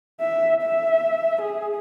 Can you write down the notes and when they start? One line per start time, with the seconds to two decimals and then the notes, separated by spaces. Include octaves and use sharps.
0.21 E5
0.63 E5
1.42 G#4